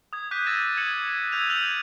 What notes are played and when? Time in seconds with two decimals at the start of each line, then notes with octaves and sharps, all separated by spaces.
0.13 D#6 G#6
0.31 D6 F#6 G6 B6 D#7
0.46 E6 G6 A6 A#6 D#7 E7
0.77 G#6 C#7 E7 F#7
1.32 E6 G6 G#6 D#7 F7
1.50 F6 G6 F7 F#7